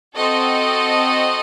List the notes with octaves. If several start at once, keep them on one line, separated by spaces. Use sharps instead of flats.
C4 F#4 A4 D#5